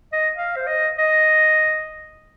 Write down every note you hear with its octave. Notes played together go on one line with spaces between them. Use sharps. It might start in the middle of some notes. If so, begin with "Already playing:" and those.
D#5
F5
C5
D#5
D#5